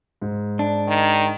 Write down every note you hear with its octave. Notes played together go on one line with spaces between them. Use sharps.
G#2
D4
D#3